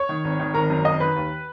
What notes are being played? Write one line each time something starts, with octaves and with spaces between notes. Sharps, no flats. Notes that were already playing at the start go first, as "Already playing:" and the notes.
Already playing: C#5 C#6
D#3
G#1
D#3
G#1 A#4 A#5
F#2
D#3 D#5 D#6
D#3 B4 B5
D#2